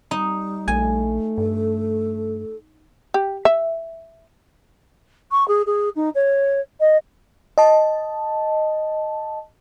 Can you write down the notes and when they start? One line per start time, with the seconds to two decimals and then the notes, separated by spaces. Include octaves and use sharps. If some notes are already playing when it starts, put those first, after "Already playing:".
0.11 G3 D#4
0.68 A#1 A3 G#5
1.38 G2 A4
3.14 G4
3.45 E5
5.32 C#6
5.48 G#4
5.67 G#4
5.96 D#4
6.15 C#5
6.80 D#5
7.58 D#5 A5